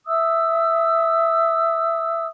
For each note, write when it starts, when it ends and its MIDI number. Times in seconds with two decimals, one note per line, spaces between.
0.07 2.27 76
0.07 2.27 87
0.07 2.27 88